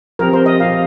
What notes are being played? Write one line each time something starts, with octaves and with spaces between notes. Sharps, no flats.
F3 C4 G4 A#4
C5
D#5
F3 C4 G4 F5